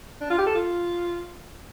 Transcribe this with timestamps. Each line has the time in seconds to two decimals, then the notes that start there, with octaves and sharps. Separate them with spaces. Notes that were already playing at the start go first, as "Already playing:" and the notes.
0.21 D4
0.30 F4
0.39 G4
0.46 A4
0.55 F4